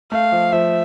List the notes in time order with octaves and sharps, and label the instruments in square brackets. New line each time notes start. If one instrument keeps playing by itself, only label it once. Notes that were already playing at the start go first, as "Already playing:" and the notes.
[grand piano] A3 [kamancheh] F5
[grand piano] F3
[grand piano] F3 [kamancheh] E5